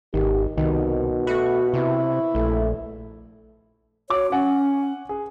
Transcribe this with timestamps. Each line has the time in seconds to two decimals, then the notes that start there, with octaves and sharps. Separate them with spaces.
0.14 G#1 D#3 G4
0.57 C2 B2 D#3
1.27 A3 F#4 B4 C#6
1.73 C3 E4
2.35 A#1 A3
4.10 F#4 C#5 D6
4.32 C#4 F#5 G#5
5.09 G#4